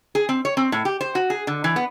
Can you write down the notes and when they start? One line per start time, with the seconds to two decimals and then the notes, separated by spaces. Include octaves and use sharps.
0.15 G#4
0.29 C4
0.45 C#5
0.57 C4
0.72 A2
0.85 G4
1.01 C5
1.15 F#4
1.30 G#4
1.47 D3
1.64 E3
1.76 B3